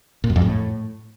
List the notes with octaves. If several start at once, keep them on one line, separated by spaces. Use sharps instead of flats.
A#2
F#2
F2
A2